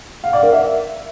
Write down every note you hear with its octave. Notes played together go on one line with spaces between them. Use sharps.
F5
D5
A#4
E5